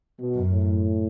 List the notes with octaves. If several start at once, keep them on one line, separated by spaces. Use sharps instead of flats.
B2
F#2
A2